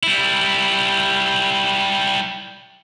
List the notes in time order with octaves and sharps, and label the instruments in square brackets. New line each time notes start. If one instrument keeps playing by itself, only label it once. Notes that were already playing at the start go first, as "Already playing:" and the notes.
[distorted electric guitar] G3 E4